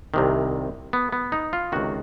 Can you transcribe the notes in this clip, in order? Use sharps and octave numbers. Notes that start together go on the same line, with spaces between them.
C2 C3 D#3
B3
B3
D#4
F4
C#2 C3 D#3 F#4